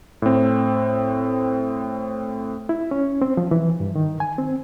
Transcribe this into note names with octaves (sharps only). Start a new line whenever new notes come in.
A2 C4
E4
C#4
C4
F3
E3
G2
D#3
G#5
C4